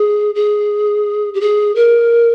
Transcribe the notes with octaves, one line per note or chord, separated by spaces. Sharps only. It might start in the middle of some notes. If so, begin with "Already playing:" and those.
Already playing: G#4
G#4
G4
G#4
A#4